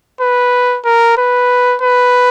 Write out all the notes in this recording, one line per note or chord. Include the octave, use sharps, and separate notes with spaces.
B4
A#4
B4
B4